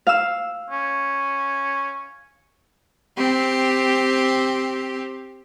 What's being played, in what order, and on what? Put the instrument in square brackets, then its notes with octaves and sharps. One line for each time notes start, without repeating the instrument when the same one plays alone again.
[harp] F5 E6
[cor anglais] C#4
[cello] C4 G4